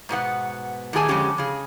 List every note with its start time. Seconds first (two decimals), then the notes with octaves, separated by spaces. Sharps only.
0.09 G#2 B2 B3 F#5
0.93 A2 D#3 G4 G#4 G#5 A5
1.09 F2 D3 G#3 C#4 G4
1.38 C#3 G#4